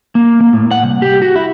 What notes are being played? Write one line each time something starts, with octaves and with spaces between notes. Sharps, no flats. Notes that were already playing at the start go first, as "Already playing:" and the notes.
A#3
A#3
A2
F#5
C2
G4
F#4
E4